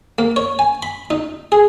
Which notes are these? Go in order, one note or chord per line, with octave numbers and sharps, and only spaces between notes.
A#3
C#5
G#5
B5
D#4
G#4